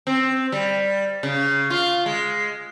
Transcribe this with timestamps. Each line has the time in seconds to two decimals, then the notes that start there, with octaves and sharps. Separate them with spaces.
0.07 C4
0.52 G3
1.23 C#3
1.70 F4
2.06 G#3